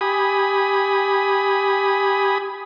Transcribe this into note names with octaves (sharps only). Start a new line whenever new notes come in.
G4 G#5 B5 D#6